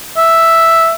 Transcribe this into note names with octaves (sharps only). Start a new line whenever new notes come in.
E5